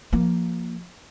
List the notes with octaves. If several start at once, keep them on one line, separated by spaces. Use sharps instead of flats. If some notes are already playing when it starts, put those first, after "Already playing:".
F3 A#3